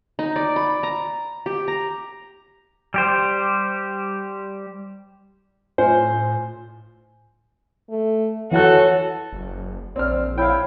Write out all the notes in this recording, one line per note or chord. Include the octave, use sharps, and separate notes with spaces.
D#4
D5
B5
A#5
G4
A#5
G3 G4 C5
A2 F4 C5 G#5
A3
E3 F#4 A4 C#5 F#5 F#6
F#1
A#1 C4 D5 F6
E4 C#5 F5 G5